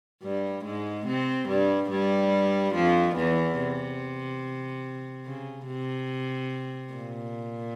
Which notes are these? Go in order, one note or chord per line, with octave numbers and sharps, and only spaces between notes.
G2 G3
G#2 G#3
C3 C4
G2 G3
G2 G3
F2 F3
E2 E3
C3
C#3
C3
A#2